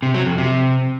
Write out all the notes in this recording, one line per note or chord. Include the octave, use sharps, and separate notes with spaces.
C3
F#3
F2
C3